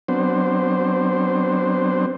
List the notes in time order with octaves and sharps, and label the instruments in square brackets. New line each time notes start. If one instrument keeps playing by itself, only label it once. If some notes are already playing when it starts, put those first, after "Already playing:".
[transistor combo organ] F#3 B3 C4 D4 C5